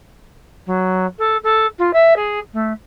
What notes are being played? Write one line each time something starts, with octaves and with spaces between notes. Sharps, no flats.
F#3
A4
A4
F4
E5
G#4
A3